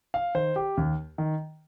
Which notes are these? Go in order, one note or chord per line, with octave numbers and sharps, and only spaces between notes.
F5
D#3 C5
G4
D#2
D#3